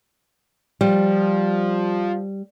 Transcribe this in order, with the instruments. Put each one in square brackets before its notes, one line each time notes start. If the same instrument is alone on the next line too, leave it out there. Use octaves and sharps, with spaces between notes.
[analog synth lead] F3 [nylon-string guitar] G3